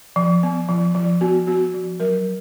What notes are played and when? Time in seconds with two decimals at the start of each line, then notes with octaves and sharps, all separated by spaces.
0.16 F3
0.43 B3
0.69 F3
0.95 F3
1.21 B3 F#4
1.47 B3 F#4
1.74 F3
2.00 F#3 A#4